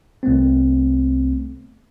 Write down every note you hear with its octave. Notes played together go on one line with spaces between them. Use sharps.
C2 A3 B3 C4